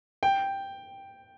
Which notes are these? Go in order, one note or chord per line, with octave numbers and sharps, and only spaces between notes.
G5